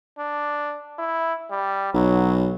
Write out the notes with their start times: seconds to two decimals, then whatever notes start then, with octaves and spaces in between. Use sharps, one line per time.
0.19 D4
0.99 E4
1.51 G3
1.94 B1 F#3